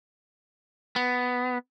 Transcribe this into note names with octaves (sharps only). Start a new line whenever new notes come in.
B3